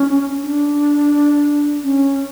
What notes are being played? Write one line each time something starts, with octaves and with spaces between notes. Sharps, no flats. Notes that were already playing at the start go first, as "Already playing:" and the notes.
Already playing: C#4
D4
C#4